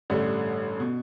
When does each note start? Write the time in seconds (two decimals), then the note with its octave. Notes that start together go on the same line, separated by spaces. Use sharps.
0.10 A1 G2 D3 A3
0.80 B2